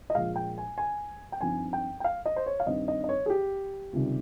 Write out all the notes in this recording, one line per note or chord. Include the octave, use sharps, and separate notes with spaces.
D#5
A#1 A#2 G#3 F5
G5
G#5
G#5
G5
G2 F3 C4 D#4 G#5
G5
G5
F5
D#5
C5
C#5
F5
G2 D#3 G3 C4 D#4 D#5
D#5
D#5
C#5
G#4
G4
C#2 C3 D#3 G3